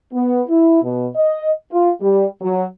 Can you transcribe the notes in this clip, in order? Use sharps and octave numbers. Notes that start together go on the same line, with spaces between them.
B3
E4
B2
D#5
F4
G3
F#3